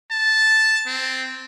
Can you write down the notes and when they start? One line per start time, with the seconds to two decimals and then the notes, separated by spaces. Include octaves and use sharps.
0.11 A5
0.87 C4